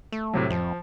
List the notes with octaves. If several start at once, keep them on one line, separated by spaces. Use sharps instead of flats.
A3
A2 C3 F#3
F2 F3